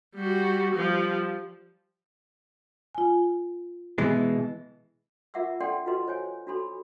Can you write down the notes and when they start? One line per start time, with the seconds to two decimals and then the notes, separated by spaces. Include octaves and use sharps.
0.16 G3 F#4
0.74 F3 G3
2.95 F4 G#5
3.98 B2 E3 G#3
5.34 F4 A#4 E5 F#5 D6 E6
5.60 D4 A4 D5 F#5 G5 C6
5.86 F4 F#4 A4 B4 D#5 C6
6.07 C5 C#5 G#5
6.47 D4 F#4 A4 B5 C6